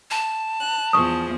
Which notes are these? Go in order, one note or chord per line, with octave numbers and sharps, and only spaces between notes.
A5
F#6
E2 F3 G#4 C#6 D#6